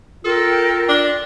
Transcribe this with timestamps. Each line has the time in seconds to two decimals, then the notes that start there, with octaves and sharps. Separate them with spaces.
0.25 F4 A4 A#4 G5
0.89 D4